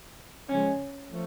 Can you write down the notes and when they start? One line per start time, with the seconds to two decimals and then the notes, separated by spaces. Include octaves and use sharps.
0.49 C#3 F3 G#3 C#4
1.11 F3 A3